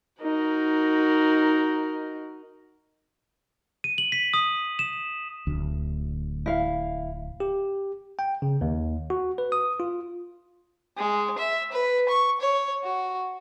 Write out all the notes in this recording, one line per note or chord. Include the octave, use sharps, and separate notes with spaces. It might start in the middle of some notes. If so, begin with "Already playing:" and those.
D#4 F#4 A#4
D#7
F#7
B6
D#6
E7
D1 D2
E4 F5
G4
G5
C#3
D#2
F#4
B4
D#6
F4
G#3
E5
B4
C#6
C#5
F#4